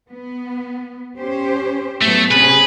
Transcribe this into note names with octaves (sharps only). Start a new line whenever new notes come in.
B3
C#4 G4 C5
A2 F#3 A3 B3
C3 C#4 G#4 B4